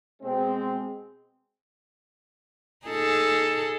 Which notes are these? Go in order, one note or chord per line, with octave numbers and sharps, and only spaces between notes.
B2 G#3 C4
D#4 G#4 A4